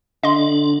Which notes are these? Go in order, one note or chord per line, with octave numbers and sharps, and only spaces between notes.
D3 D4 D#5 C6